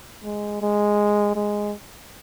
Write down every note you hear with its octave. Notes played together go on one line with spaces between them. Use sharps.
G#3
G#3
G#3